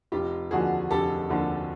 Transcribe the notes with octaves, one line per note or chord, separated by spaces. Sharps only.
F1 F4 G4
D#2 D3 F3 F#4 G#4
F1 G4 A4
D#2 D3 F3